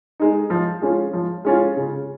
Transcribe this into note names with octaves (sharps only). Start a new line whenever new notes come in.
G#3 D#4
F3
G#3 C#4 F4
F3
G#3 C#4 F4
C#3